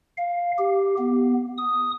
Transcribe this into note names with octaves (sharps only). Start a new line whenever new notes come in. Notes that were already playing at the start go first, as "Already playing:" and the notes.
F5
G4
B3
D#6